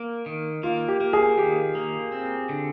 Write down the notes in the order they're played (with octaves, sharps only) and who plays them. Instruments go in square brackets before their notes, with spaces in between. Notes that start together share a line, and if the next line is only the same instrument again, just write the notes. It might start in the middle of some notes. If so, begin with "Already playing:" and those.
Already playing: [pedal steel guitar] A#3
D#3
[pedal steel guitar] A#3 [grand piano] F4
[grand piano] G4
[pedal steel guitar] A#3
[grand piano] G#4
[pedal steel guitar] D#3 [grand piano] G4
[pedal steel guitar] A#3
C4
D3